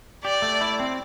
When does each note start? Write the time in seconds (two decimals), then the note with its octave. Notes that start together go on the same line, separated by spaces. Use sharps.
0.25 G4 D5
0.42 A3
0.61 E4
0.80 C4